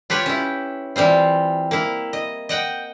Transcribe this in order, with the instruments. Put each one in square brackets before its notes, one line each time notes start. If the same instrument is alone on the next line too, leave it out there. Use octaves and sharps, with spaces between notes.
[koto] F4 G4 B4 C#5
C#4 E4
E3 G3 C4 F4
A#3 E4
D#5
D#5 F#5 G5